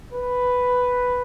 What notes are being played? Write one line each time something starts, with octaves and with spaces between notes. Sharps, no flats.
B4